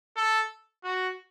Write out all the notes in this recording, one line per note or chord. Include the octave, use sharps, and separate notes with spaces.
A4
F#4